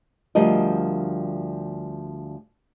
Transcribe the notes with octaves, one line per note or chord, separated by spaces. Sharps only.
D2 F3 G3 A#4 D#5